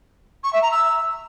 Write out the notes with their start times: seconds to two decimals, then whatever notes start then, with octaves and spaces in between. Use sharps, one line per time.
0.44 C#6
0.53 E5
0.62 A#5
0.71 E6